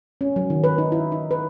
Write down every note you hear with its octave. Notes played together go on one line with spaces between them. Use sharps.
C#4
F#3
D#3
B4
D#4
E4
D#4
B4